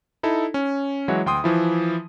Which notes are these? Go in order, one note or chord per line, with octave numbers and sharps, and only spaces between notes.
D#4 E4 A4
C#4
E3 F#3 G#3 E4 F#4 C#5
D2 G5 C6 D#6
E3 F3 E4